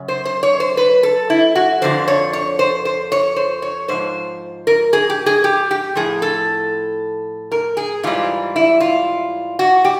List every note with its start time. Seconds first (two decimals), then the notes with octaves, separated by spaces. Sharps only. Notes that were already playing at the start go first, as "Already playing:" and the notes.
Already playing: F#2 C#3
0.08 C5
0.25 C5
0.43 C#5
0.60 C5
0.77 B4
1.03 A4
1.30 E4
1.55 F#4
1.82 F2 D3 F3 C5
2.08 C#5
2.33 C#5
2.59 C5
2.85 C5
3.12 C#5
3.36 C5
3.62 C#5
3.88 G#2 F3 C5
4.67 A#4
4.93 G#4
5.10 G4
5.26 G#4
5.44 G4
5.71 G4
5.95 A2 F3 G#4
6.22 A4
7.52 A#4
7.77 G#4
8.03 G#2 E3 G3 F4
8.56 E4
8.80 F4
9.59 F#4
9.84 G4